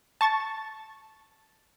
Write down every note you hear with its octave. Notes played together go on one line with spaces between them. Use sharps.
A5 C#6 A6